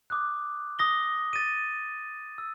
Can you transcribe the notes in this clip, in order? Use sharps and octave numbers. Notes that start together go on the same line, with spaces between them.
D6 D#6 F#6
D#6 A#6 G7
A6 D#7
E6